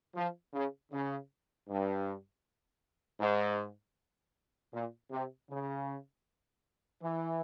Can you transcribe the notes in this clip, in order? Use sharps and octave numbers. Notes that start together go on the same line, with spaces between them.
F3
C#3
C#3
G2
G#2
A#2
C3
C#3
E3